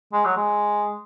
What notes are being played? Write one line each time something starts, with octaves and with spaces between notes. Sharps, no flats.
G#3
F#3
G#3